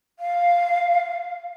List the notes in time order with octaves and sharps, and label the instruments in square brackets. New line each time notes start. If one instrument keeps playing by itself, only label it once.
[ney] F5